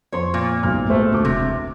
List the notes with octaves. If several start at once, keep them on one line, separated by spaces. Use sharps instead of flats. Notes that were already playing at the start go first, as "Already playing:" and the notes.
F2 C5 C#5 C6
A#2
B1 G#2 F6
G#3 A3 F#4 C5
D2 D6
E1 C3